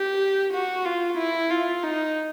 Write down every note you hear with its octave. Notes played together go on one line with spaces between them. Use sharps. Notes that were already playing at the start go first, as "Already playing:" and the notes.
Already playing: G4
F#4
F4
E4
F4
D#4